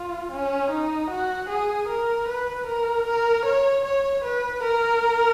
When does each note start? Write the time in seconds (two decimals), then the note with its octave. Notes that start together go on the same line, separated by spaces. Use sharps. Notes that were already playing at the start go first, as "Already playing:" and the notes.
Already playing: F4
0.32 C#4
0.70 D#4
1.10 F#4
1.49 G#4
1.88 A#4
2.28 B4
2.67 A#4
3.06 A#4
3.45 C#5
3.84 C#5
4.24 B4
4.63 A#4